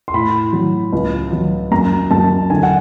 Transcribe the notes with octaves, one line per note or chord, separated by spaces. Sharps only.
C6
A2 B5
F#3
C#2
F#3
F#2 A#5
F#2 A5
D3 G#5
F#5